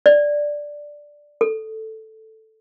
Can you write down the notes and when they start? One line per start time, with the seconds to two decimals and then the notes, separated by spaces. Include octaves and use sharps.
0.06 D5
1.41 A4